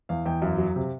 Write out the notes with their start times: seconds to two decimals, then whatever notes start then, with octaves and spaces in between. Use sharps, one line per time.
0.09 E2 F5
0.25 E2 G5
0.42 F#2 F5
0.58 F#3
0.76 C3